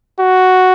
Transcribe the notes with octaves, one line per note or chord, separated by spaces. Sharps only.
F#4